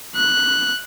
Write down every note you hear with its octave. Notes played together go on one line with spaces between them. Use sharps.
F#6